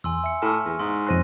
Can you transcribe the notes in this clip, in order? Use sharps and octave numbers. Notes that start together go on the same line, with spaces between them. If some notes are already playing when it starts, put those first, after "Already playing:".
E2 G#5 C6 E6
E5 G#5 C#7
A2 C#6 F6
E2
G#2 C6
F2 C5 C6 F#6 A#6 D#7